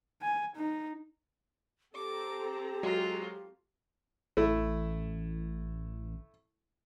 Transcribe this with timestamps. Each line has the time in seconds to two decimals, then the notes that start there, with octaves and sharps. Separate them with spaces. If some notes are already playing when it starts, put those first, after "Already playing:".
0.22 G#5
0.56 D#4
1.94 C4 G4 A4 A#5 D6
2.83 F#3 G#3 F4 F#4
4.37 A1 A3 E4